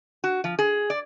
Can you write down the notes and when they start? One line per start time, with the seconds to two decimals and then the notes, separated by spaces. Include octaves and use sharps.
0.24 F#4
0.44 F3
0.59 G#4
0.90 D5